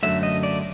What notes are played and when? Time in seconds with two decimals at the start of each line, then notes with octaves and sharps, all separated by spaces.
0.03 F#2 D3 F#3 A3 E5
0.23 D#5
0.43 D5